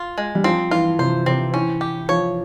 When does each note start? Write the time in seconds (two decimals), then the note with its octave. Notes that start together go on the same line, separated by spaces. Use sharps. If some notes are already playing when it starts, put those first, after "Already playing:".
Already playing: F4
0.18 G#3
0.35 G3
0.44 F3 C4
0.71 E3 F4
0.99 C3 C5
1.26 C3 C4
1.54 E3 C#4
1.81 G4
2.09 F3 C#5